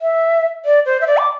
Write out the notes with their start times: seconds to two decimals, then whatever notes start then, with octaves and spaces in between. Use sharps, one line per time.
0.02 E5
0.65 D5
0.86 C5
1.01 E5
1.07 D5
1.18 D6